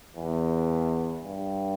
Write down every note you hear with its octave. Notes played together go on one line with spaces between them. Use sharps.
E2
G2